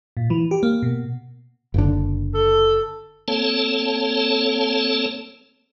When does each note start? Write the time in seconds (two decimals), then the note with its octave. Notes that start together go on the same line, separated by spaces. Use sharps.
0.17 A#2
0.30 E3
0.51 G4
0.63 A#3
0.82 B2
1.74 F#1 D3
2.34 A4
3.28 A#3 C4 A4 C#5 A5